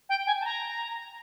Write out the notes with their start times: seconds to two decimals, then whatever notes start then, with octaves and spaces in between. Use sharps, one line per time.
0.09 G5
0.27 G#5
0.41 A5
0.45 A#5